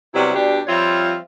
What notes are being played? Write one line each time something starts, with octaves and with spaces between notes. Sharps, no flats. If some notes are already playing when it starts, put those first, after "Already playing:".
C3 F#3 G3 B3 E4
B2 D4 G4
F3 G3 C4 F4 C#5 E5